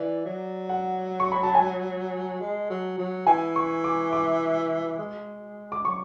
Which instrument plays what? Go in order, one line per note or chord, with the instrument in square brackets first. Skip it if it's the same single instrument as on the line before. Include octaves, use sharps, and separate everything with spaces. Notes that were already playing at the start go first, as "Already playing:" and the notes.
Already playing: [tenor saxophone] E3 [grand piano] D5
[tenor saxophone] F#3
[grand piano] F#5
C#6
B5
A5
G#5
[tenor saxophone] G#3
F#3
F#3
[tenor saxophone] E3 [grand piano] G#5
[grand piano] C#6
D6
D6
[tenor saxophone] G#3
[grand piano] D6
[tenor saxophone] F#3 [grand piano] C#6